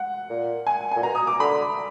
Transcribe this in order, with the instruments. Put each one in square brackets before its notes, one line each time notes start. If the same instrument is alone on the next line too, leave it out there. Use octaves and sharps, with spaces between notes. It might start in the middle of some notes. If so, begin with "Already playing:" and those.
Already playing: [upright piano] F#5
[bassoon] A#2
[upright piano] G#5
[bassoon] A#2 [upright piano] G#5
[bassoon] B2 [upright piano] A#5
[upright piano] D#6
D6
[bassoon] D3 [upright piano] B5